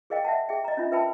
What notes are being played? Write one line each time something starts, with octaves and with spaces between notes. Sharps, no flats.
G#4 A#4 D#5 F5 G5
E5 F#5 A5
G#4 E5 G5
D#5 A#5
C#4 D4 F4 E5
A#4 B4 E5 G5 A5 B5